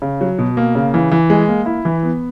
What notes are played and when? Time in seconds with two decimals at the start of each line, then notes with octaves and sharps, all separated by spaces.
0.02 C#3
0.21 F#3
0.39 B2
0.57 A#3
0.75 C#3
0.94 E3
1.12 E3
1.30 G#3
1.48 A#3
1.66 E4
1.85 E3
2.03 B3